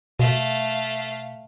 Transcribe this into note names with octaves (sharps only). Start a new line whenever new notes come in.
B2 A3 F5